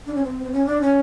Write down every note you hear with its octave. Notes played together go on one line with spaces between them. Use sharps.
D4
C#4
C4
C4
C#4
D4
C#4